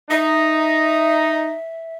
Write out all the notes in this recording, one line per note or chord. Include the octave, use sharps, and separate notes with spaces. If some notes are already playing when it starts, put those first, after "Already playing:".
D#4 E5